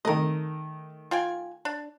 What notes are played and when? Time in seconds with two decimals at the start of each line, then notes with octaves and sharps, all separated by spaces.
0.05 D#3 A3 A#4 D#5
1.11 F4 G5 G#5
1.65 D4